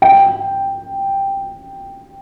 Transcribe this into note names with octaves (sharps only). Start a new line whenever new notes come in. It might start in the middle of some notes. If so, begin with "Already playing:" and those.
G5